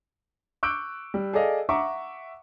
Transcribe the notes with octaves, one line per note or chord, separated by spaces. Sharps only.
C#6 D6 E6 F#6 G6 D7
G3
G#4 A4 D5 D#5 F5
E5 F#5 A#5 C#6 D6